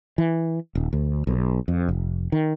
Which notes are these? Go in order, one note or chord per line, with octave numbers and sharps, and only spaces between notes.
E3
D#1
D2
B1
F2
F1
D#3